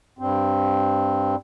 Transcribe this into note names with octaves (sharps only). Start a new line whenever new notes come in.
G2 C4